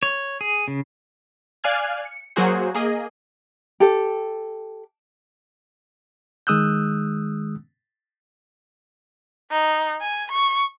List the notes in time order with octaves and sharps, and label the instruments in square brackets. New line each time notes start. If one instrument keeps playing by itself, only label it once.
[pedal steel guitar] C#5
G#4
C#3
[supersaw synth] D5 F5 G#5 F6 F#6 G#6
C#7
F#3 A#3 F#4 G#4 C5
A#3 G#4 D#5
[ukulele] G4 A4
[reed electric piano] D#3 G#3 D#6 E6 F#6 G6
[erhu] D#4
G#5
C#6